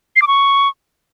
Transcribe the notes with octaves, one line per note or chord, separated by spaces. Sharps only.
C7
D6
C#6